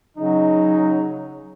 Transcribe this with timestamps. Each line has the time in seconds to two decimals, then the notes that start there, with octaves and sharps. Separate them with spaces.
0.17 C#3 F#3 D#4